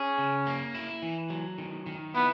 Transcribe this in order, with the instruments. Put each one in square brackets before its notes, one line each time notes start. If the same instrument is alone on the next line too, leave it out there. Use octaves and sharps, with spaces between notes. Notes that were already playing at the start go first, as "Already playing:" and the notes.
Already playing: [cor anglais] C#4 [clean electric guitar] G#4
[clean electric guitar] C#3
A#3
E4
E3
F#3
D#3
D#3
[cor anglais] B3 [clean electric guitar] E4